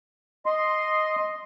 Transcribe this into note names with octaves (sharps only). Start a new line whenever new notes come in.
D#5 C6